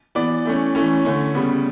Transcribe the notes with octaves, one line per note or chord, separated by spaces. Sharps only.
E3 B3 D5
E3 A3 C#4
E3 A3 C#4
D3 A3 C#4 C#5
C#3 G3 B3